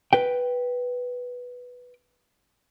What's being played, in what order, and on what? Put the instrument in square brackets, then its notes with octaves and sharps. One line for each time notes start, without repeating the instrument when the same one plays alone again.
[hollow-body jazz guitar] B4 G5